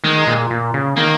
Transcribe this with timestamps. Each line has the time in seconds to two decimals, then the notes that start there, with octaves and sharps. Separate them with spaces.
0.04 D#3 G#3
0.27 A#2
0.51 A#2
0.74 C#3
0.97 D#3 A#3